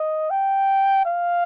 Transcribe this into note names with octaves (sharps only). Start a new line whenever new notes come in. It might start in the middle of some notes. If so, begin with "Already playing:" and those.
Already playing: D#5
G5
F5